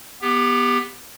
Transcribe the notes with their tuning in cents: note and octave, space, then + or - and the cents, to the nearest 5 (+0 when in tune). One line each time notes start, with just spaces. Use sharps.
B3 -10 G4 +20